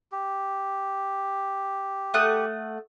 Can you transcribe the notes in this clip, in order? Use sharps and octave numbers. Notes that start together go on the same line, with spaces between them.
G4
A3 F#5 D#6